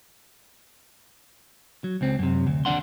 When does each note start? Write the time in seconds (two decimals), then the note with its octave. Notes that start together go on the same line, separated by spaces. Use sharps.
1.84 F#3
2.01 C#2 C4
2.19 F#2 C3
2.47 D2
2.65 D#2 D4 F#5 C6